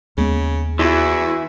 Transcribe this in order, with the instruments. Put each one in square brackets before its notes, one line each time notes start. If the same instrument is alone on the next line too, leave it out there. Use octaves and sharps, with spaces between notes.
[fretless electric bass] D#2 G#3 B3 [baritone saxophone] C#3
[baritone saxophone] E2 [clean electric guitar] E3 [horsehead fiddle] E4 F#4